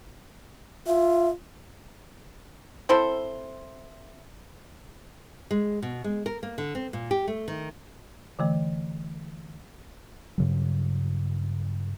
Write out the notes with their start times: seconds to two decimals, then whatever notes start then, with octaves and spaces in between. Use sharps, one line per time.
0.87 F4 E5
2.89 C4 E4 A4 C5
5.51 G#3
5.83 B2
6.04 G#3
6.26 A#4
6.43 A#3
6.58 D3
6.75 C4
6.93 A#2
7.11 G4
7.28 A3
7.48 D#3
8.39 D3 E3 A3
10.38 G2 C#3 F#3